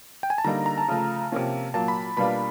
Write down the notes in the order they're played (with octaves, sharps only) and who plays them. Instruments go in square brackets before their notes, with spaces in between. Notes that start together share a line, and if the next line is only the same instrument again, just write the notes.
[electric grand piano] G5
G#5
A5
[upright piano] D3 G3 A#3 D#4 [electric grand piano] A#5
[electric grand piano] A#5
A5
[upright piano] C#3 F3 A3
C3 F3 A#3 C#4 F4
[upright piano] A#2 F#3 A#3 [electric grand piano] A5
[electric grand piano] B5
[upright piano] B2 G3 A#3 D4 F4 [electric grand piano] B5